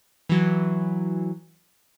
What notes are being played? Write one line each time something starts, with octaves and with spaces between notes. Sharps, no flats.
E3 F#3